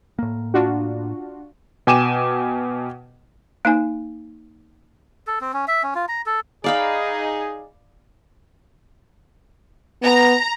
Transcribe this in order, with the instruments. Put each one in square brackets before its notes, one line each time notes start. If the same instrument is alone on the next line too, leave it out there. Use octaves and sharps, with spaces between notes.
[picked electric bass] A2 A#3
[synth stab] D4 F4 F#4
[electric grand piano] B2 G5 G#5 D6 D#7 E7
[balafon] A#3 D#4 G#5
[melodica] A4
C4
C#4
E5
C#4
F4
A#5
A4
[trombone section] D#4 G#4 [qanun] D5 F5 B5
[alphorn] B3 [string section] A#5